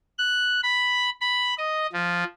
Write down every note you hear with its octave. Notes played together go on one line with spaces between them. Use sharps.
F#6
B5
B5
D#5
F3